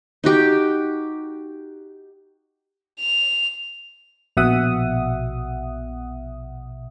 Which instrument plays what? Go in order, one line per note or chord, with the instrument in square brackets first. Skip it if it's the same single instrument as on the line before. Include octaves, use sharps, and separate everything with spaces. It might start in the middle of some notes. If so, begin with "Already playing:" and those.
[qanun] D#4 F#4 G4
[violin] F7
[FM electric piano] A#1 B2 E5 F#5 D#6